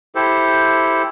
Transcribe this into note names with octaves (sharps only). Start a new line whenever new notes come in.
E4 G4 A4 C5